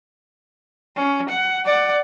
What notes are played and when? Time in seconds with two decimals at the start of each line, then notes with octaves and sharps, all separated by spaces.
0.96 C#4
1.29 F#5
1.65 D5 F#5